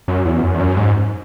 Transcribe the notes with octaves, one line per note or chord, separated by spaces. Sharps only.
F#2
E2
F#2
E2
F#2
G#2